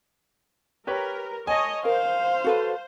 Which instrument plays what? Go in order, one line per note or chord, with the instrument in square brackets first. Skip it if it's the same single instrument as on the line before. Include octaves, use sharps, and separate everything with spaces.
[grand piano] G4 B4 C#5 [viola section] A#4
[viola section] C#5 D#5 [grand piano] G#5 A5
[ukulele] A#4 [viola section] C5 [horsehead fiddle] F5
[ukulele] F#4 A4 B4